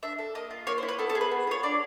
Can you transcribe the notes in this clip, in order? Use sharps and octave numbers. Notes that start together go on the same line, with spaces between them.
D4 E5
A4
A#3 D#5
F4
A#3 C#5
C5
E4
B4
B3 A4
A4
G#4
B4
B3
F4 C#5
D4 D5